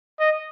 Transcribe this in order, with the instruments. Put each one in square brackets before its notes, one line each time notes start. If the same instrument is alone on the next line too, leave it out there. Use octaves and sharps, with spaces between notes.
[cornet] D#5